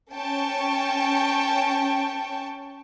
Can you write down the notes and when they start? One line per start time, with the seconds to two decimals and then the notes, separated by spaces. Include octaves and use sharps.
0.12 C#4 G5 A5 C#6